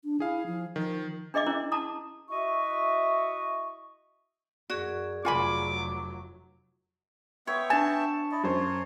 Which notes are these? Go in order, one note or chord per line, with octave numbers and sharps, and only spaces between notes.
D4
E4 G#4 F5
F3
D#3 F3
D4 G#4 D#5 E5 D6
C#4 E4 A#4
A5 A#5 D6 D#6
E4 F#4 D#5 E5 C#6
F#2 F#4 G#4 D5
F1 F#3 F4 G#5 B5 D6
B3 C#5 E5 G5
D4 G#5 A5
E4 D5 D#5
F#2 C5 C#5